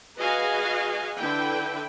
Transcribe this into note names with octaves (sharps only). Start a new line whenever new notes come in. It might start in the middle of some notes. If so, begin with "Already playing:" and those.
F#4 G#4 B4 D#5 F5 G#5
D3 E4 B4 G5